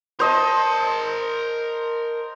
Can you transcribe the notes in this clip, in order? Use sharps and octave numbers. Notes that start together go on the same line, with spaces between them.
A#4 C5 D#5 A5